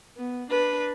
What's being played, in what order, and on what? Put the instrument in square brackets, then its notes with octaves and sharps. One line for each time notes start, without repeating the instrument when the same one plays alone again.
[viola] B3
D4 B4